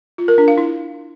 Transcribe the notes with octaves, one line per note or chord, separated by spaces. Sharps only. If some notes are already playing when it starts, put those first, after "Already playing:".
F4
A#4
D4
F5
E4